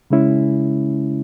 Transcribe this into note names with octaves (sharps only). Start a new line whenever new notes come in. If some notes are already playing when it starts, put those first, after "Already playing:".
C#3 G#3 C#4 E4